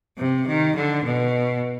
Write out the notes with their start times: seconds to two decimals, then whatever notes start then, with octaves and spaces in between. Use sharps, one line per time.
0.18 C3
0.47 D#3
0.76 D3
1.05 B2